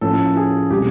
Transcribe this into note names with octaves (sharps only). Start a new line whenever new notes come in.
A2 F3 A#3 C#4 A4
G#4
B2 G3 C4 G4